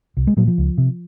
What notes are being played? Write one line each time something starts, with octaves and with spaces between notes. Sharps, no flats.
C2
G#3
A#2 F#3
F3
C#2
C3